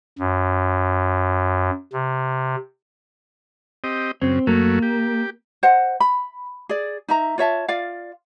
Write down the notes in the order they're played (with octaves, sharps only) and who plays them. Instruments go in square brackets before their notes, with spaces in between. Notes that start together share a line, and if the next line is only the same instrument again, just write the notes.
[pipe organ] F#2
C3
[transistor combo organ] C4 G4 D#5
[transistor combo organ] F#2 C#3 [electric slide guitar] C4
[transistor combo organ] F#2 F#3 A3 [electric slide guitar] A#3
[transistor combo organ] G4
[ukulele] C5 D#5 F#5
B5
G#4 D5
D#4 E5 A#5
F4 C#5 E5 A5
F4 D5 F5